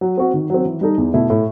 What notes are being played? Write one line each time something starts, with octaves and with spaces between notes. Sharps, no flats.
F#3
C4 F#4
D#3
F#3 C4
E3
G3 D#4 A4
E2
B2 A3 E4
A2